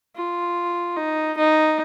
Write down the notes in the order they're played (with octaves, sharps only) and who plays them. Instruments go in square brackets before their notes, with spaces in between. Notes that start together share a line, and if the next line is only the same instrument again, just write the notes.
[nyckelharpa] F4
D#4
D#4